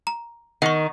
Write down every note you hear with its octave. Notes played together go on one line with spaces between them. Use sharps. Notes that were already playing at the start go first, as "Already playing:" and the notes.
A#5
D#3 F#5 C#6